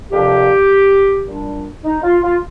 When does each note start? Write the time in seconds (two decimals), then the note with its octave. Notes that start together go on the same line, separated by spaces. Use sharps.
0.11 F2 C3 F3 A#3 D4 G4
1.26 A#2 G3 D4
1.85 D#4
2.03 F4
2.23 F4